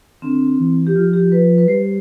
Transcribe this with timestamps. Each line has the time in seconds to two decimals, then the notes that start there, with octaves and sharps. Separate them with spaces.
0.22 D3 C4
0.59 E3
0.87 G4
0.95 F3 F4
1.13 G4
1.32 B4
1.58 B4
1.68 G3 C5